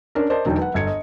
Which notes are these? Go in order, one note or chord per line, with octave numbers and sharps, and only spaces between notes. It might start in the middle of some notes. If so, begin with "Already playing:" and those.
C#4 D4 A#4
A#4 C5 D5 D#5 A5
E1 D3 F#3 D#4 G5
B4 F#5
G1 D#5 G#6 C#7
D#5